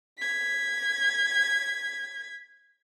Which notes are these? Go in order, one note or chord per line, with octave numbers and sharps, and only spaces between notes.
G#6 B6